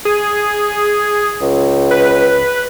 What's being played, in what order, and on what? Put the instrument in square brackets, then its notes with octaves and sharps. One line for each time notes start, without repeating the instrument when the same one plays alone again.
[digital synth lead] G#4
[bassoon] C#2
[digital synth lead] B4